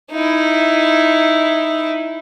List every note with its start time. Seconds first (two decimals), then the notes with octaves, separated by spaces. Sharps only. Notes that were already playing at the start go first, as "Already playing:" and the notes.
0.11 D#4 E4